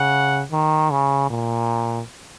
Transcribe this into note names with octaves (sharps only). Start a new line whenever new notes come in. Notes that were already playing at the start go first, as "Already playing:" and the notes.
Already playing: C#3 F#5
D#3
C#3
A#2